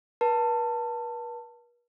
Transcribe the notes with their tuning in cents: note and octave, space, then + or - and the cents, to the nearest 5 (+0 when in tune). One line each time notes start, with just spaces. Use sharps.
B4 -45 A5 +20